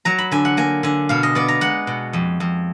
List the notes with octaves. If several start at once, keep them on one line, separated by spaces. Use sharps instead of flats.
F#3 A#5
B5
D3 G#5
F#5
A#3 G#5
D3 G#5
B2 F5
D#5
B3 D5
A#5
G#3 F#5
B2
F2
F2